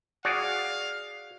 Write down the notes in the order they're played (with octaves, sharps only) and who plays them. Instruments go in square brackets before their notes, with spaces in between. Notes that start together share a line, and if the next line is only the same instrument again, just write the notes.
[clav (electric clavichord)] F#4 G#4 D5 [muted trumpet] F5